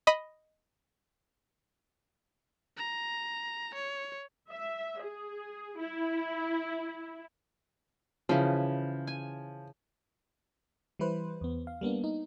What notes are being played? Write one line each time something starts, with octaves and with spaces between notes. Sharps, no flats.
D#5 B5
A#5
C#5
E5
G#4
E4
C#3 E3 F3
G#5
E3 G3 E4 B4 C5
E2 B3
F5
G3 A#3 B3 D4
D#4